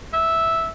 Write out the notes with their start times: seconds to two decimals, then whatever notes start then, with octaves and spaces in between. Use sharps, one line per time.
0.13 E5